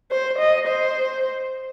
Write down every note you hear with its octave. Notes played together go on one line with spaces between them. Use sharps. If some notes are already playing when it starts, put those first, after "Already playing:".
C5
D#5
C5